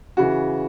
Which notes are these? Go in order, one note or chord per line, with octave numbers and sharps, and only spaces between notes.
C#3 E3 F#4